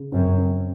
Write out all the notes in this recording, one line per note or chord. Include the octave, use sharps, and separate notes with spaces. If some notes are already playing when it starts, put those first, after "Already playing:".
Already playing: C#3
F#2 C4
C4